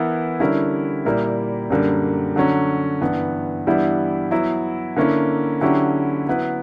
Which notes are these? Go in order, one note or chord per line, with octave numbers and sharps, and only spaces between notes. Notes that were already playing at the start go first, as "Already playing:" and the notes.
Already playing: E3 B3 E4 A#4
D3 G3 C#4 E4 A#4
A#2 G3 A#3 E4 A#4
F#2 D3 G3 A#3
D3 F#3 C#4
G2 E3 B3
G2 E3 G3 B3 E4
F#3 B3 E4
D3 A#3 C#4 E4
D3 F#3 C#4 E4 G4
F#3 B3 E4 B4